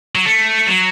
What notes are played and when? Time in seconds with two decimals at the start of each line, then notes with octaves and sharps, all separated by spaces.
0.15 F#3
0.25 A3
0.67 F#3